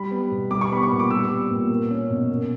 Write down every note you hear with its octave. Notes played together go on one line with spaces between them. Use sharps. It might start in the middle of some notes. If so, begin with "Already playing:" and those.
Already playing: G3 B5
B3
B2
G3 D6
C#6
B3 B5
C#6
A#2
D6
G3 E6
B3
A#2
A#3
C#4
B2
A#3